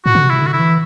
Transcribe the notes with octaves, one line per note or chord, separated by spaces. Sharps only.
A2 F#4
D3
C3
E4
D3
F#4
E4
E3